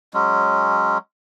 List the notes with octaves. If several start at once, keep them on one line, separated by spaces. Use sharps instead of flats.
F#3 G#3 C#4